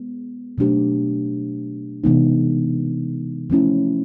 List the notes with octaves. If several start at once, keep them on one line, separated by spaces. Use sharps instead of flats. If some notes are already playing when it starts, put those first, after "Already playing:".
Already playing: G#3 B3
B2 F#3 A3 D4 G4
C3 E3 G#3 B3 D#4
F3 A3 C#4 E4